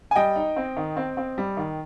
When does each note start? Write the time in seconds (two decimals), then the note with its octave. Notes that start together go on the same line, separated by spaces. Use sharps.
0.11 G#5
0.15 G3 D#5 G5
0.36 D#4
0.56 C4
0.77 D#3
0.97 C4
1.17 C4
1.38 G3
1.57 D#3